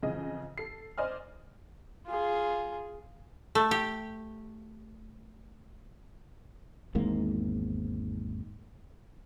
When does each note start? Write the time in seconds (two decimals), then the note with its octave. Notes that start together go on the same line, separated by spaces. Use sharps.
0.03 F2 C#3 E3 G#4 D#5
0.58 A4 C7
0.98 C5 D5 D#5 G#5 F6
2.07 F4 G#4
3.55 A3
3.71 G4
6.95 G#1 E2 G#2 A#3